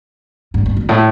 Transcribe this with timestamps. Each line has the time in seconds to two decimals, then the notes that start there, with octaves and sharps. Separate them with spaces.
0.54 G2
0.66 G2
0.77 G2
0.89 A2